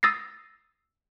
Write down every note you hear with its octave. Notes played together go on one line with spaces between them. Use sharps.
D#6 E6 A6 A#6 C7